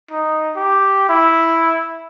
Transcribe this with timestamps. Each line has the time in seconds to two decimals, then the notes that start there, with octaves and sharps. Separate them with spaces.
0.11 D#4
0.56 G4
1.09 E4